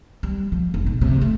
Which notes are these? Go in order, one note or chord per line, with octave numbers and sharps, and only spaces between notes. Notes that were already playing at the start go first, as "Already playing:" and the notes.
G3
F3
F1
B2
C3
A3